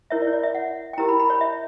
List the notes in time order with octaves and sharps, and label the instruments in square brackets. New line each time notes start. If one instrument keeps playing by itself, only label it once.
[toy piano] E4 A#4 C#5 E5
D5
C#5
D5
E5
F#5
G5
E4 G4 A#4 A#5
B5
B5
C#5
E5